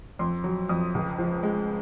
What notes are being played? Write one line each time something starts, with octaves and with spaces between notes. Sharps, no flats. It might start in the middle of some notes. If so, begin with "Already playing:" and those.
F2 C6
F#3
F2 D#6
C#2
F3
G#3